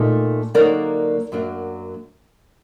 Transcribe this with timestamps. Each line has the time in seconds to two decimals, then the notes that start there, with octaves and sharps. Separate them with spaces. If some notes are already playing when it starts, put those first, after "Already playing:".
Already playing: A#2 A3 D#4
0.54 D3 F#3 A#3 D#4 A#4 D5
1.32 F#2 F#3 A#3 D4